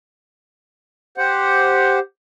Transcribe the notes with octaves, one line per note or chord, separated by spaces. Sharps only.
G4 C5 F#5